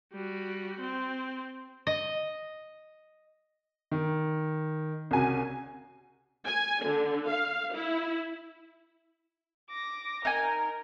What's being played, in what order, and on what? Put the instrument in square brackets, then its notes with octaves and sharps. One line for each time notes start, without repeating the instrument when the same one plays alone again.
[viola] G3 F#4
C4
[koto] D#5
[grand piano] D#3
[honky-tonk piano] C2 G#5 [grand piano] C#3 F#4
[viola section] G#5
D3
F5
E4
[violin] D6 A#6
[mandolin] D#4 G#5 [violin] A#4